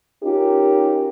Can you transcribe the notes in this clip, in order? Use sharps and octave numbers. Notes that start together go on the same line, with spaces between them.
C#4 D#4 F4 G4 A#4